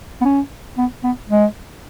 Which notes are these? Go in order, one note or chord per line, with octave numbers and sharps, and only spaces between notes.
B3
C#4
B3
B3
G#3